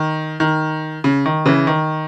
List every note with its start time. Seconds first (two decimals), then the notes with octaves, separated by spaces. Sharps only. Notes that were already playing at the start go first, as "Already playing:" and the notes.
Already playing: D#3
0.40 D#3
1.04 C#3
1.26 D#3
1.46 C#3 E3
1.67 D#3